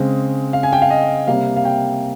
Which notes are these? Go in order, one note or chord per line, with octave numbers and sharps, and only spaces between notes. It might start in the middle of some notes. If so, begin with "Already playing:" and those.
Already playing: C#3 G#3 C4
F5
G#5
G5
F5
D#5
C3 G3 A#3 F5
F5
G5